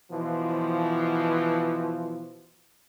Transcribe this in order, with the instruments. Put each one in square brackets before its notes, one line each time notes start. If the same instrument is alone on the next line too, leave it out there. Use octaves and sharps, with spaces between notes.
[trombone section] B2 E3 F3